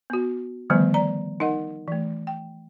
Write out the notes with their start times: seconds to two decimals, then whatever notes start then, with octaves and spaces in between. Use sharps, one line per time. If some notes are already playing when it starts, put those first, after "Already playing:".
0.10 B3 F#4
0.70 D3 D#3 F3 G3 A3 B3
0.94 D5 A#5
1.40 D#4 A#4 D#5 F#5
1.88 E3 A3
2.27 G5